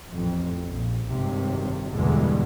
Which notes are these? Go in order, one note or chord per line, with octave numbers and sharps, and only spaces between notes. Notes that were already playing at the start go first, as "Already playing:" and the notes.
A1 F2
A#1
G#1 G2 C3
E2 G2 B2 D3 E3 G#3